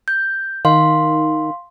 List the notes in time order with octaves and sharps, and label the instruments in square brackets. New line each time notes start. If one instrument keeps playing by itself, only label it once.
[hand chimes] G6
[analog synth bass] D#3 [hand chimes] F5 C6